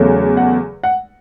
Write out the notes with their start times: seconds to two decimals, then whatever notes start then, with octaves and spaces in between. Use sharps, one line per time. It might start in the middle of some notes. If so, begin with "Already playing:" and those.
Already playing: E2 C#3 F#3 A3
0.37 F#5
0.84 F#5